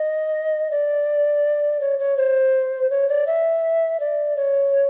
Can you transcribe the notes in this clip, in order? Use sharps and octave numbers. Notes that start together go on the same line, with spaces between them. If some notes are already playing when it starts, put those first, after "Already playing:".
Already playing: D#5
D5
C#5
C#5
C5
C#5
D5
E5
D5
C#5